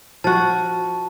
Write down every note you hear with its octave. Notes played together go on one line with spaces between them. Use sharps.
F3 F#4 A5